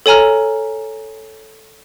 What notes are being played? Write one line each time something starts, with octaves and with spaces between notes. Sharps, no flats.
A4 C#5 G#5 A#5 F6